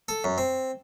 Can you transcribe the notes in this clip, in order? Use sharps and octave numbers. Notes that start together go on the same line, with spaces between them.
A4
F#2
C4